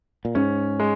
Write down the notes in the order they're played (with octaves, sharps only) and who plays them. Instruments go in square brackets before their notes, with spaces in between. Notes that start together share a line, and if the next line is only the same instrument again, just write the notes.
[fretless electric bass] A#2
[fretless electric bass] G#2 [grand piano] C#4
[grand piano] G#3